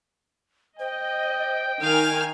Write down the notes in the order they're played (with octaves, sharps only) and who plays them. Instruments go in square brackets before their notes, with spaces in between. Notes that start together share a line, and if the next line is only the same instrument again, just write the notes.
[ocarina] C5 [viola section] D#5 [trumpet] G5
[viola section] D#3 G#5 [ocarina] D#4 [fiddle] F5 F6